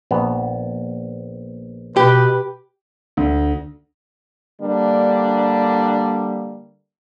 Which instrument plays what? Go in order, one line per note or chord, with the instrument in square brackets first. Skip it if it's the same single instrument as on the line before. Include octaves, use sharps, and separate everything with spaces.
[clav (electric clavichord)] A#1 B3
[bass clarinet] B2 [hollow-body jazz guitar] G4 [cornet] B4
[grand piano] D2
[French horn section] D3 G3 A#3 D4